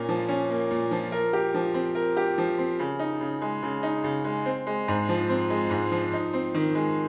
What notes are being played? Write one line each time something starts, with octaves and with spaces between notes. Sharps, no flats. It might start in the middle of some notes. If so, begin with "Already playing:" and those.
Already playing: A#2 A#3 C#4
F3
C#4
A#3
A#2
F3
A#4
G4
F3
C4
A#4
G4
F3
C4
C#3
D#4
C#3
G#3
C#3
D#4
C#3
G#3
C4
G#3
G#2
F3
C4
G#3
G#2
F3
D#4
C4
D#3
G#3